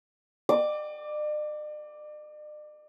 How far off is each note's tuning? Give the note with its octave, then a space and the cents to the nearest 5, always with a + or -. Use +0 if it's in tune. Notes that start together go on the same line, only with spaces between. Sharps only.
D5 +45 D6 +0